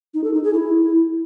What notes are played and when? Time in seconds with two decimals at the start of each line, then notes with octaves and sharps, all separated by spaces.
0.14 D#4
0.24 A4
0.34 D#4
0.44 G#4
0.54 E4